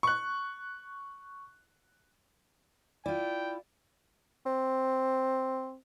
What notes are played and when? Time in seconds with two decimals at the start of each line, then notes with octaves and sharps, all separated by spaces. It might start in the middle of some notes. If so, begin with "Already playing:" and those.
0.03 C#6 F#6
3.06 E4 F4 D5 G5
4.46 C4